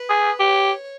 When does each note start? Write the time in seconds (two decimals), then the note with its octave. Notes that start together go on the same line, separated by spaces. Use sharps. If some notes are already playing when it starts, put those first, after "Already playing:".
Already playing: B4
0.09 G#4
0.39 G4 C#5